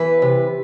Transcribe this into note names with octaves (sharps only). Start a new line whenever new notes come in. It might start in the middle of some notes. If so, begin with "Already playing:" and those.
Already playing: E3 B4
C3